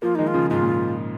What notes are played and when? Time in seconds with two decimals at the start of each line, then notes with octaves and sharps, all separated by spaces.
0.02 F3 A#3 F4
0.15 D#3 G#3 D#4
0.27 F4
0.34 C#3 F3
0.50 G#2 C#3 F4
0.63 A#2